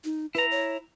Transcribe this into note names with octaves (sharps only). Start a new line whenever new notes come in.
D#4
E4 B4 A#5
C#5